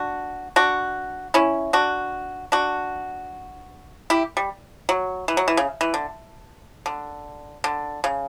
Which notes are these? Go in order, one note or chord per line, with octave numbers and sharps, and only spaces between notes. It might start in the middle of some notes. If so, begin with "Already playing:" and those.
Already playing: D4 F#4
D4 F#4
C#4 E4
D4 F#4
D4 F#4
E4 G4
G3
F#3
E3
F#3
E3
C#3
E3
D3
D3
D3
C#3